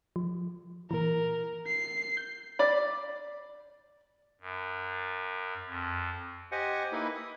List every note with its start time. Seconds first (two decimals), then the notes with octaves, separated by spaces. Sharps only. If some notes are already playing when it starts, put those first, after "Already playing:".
0.16 F3
0.91 A#2 E3 A#4
1.67 C7
2.17 G6
2.59 D5 B5
4.41 F#2
5.67 F2
6.52 G4 C5 D#5 F#5 G#5
6.92 A#3 D#4 E4 B4
7.15 D#6